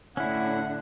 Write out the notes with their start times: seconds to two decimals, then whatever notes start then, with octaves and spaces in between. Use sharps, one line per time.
0.17 A2 D3 C#4 E4 F#5